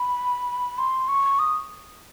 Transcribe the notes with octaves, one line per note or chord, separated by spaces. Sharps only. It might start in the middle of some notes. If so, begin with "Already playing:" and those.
Already playing: B5
C6
C#6
D#6